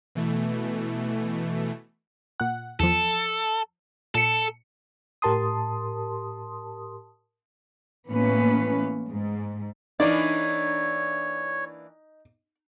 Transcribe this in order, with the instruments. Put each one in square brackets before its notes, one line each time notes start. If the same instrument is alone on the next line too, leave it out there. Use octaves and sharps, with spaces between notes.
[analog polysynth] B2 E3 A3
[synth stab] A#2 F#5
[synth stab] E2 F3 [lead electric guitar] A4
[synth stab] A#2 C#7 [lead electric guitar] A4
[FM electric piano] A2 G4 A#4 A5 C6 D#6
[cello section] A2 E3 A#3 B3 C#4 B4
G#2
[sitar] E3 A#3 D4 [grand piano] D#4 [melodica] C#5 [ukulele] D5